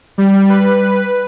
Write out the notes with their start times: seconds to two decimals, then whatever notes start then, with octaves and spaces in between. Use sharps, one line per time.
0.18 G3
0.50 B4